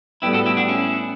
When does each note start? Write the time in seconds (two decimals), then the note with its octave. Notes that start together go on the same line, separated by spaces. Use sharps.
0.22 A2 G3 B3 E4 G4
0.33 F#4 A4
0.46 E4 G4
0.57 D4 F#4
0.69 C#4 E4